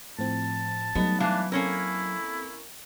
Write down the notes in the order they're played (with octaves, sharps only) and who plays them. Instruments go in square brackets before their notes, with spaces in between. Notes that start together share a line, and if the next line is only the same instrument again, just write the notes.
[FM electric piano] A2 F3 C4 [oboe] A5
[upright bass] F#3 [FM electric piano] G3 A3 D#4 [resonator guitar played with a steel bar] B3
[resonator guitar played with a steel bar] E3 F5 A5 [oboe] D4
[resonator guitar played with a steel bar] A#3 C#4 A#4 [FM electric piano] C4 A4 [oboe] E4